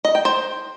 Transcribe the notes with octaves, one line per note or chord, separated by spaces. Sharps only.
D#5
G5
C5